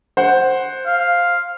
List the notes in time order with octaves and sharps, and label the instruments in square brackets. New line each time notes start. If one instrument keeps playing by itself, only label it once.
[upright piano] C5 F#5
[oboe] F5